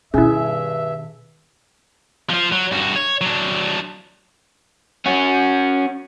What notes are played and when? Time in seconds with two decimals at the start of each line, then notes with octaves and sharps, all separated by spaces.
0.14 G2 B2 D#3 C#4 E4 G#4 E5
2.30 F3 F4
2.52 F#3
2.72 G2 F#4
2.96 C#5
3.21 F#3 D4
5.06 C#4 F#4